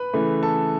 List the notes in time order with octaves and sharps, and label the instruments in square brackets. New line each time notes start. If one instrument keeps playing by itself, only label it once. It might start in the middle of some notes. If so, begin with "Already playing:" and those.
Already playing: [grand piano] B4 B5
C#3 E3 A3
A4 A5